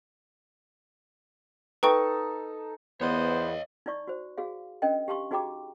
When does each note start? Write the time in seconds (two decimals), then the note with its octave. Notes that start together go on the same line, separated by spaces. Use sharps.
1.83 D#4 A4 B4 G5 C#6
3.01 E2 B3 C5 C#5 D#5
3.86 D#4 E4 D5 C#6
4.07 F#4 C5
4.38 F#4 G#4 F5
4.82 C#4 D4 A#4 D#5 G5
5.08 G4 F5 A5 C6 C#6
5.31 D#4 F#4 G#4 G5 A#5 D6